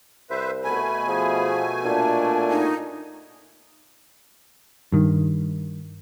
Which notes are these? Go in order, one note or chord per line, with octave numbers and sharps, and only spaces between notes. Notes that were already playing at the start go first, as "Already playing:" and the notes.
C2 B4 C5 E5
B2 A3 G#5 B5
F3 G#4
A#2 D4 A5
D#4
G2 D#3